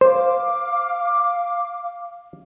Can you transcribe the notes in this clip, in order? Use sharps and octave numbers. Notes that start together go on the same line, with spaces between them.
C5 F5 D6